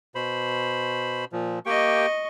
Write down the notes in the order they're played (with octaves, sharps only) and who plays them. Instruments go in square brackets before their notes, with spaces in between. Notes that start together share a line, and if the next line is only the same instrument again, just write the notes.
[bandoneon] B2 C5 B5
A#2 F3
[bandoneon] A#3 G4 G5 [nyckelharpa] D#5 C#6